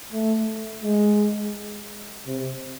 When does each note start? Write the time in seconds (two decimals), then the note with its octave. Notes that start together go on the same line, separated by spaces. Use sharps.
0.12 A3
0.84 G#3
2.27 C3